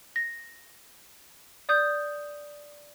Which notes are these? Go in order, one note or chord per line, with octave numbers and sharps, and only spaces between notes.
A#6
D5 D#6 G6